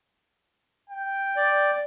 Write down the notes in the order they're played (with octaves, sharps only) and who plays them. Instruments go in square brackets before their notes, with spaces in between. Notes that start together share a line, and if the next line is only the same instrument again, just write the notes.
[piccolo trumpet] G5
[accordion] D5